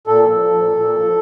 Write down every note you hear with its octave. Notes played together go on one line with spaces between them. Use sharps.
A#2 A4
F3
F3
A#2
A#2
F3